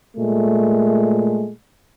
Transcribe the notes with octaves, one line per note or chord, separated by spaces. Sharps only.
A#2 G#3 A3